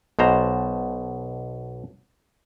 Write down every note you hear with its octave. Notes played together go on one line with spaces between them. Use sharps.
B1 B2 C5 A#5